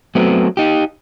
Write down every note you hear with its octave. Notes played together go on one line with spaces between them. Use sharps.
F#3 A3 B3 C4
D#4 G4